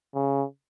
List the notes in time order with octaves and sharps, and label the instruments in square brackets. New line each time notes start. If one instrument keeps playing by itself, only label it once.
[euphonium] C#3